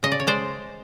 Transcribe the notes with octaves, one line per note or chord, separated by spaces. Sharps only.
C#3 D#5
D5
C#5
G#3 C5 D5